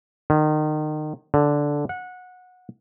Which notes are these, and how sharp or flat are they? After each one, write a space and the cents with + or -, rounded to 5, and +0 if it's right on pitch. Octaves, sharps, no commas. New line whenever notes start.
D#3 -30
D3 -5
F#5 -20